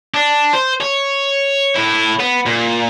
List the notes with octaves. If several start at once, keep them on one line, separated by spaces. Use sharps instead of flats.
D4
C5
C#5
A2 E4
B3
A#2